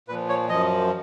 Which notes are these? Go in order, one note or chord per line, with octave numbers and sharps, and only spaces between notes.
A#2 F3 B4
C#5
F#2 F3 D#5